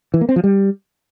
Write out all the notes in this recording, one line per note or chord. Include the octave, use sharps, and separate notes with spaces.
E3
A#3
C4
F3
G3